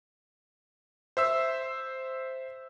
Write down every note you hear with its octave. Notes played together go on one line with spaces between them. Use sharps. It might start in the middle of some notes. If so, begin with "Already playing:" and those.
C5 E5 E6